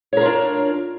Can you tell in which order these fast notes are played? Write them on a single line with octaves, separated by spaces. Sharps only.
C#5 A#4 F4 D4